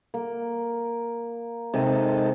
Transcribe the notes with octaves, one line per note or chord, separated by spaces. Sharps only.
A#3
C3 G#3 D#4 A4